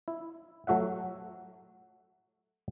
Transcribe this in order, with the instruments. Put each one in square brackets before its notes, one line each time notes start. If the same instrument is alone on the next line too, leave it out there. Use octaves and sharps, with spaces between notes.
[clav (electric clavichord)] E4
F#3 A3 F#4 E5 F#5